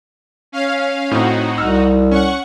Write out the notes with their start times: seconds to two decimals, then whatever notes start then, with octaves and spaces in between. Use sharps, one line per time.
0.52 C#4 F5
1.11 A2 C4 D#4 F#4
1.58 C2 E6 F6
2.11 C#4 F#5 C#6